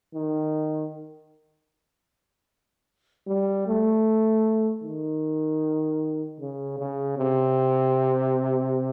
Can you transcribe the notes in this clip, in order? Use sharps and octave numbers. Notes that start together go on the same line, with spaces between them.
D#3
G3
A3
D#3
C#3
C#3
C3